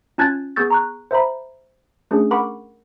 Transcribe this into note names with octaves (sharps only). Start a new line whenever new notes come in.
C#4 F4 A5 F#6 G#6 A6
B3 G#4 C#6 E6 G6 A6
A#5 C#6 F#6
C5 E5 A#5 B5
A3 C#4 D4 G#4
A#4 F#5 B5 C#6 D6